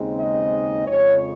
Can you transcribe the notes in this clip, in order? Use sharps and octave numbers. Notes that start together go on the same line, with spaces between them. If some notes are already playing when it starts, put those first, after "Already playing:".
Already playing: D#2 C#3 G#3 C4 D#4
D#5
F2 C#3 F3 G#3 C#5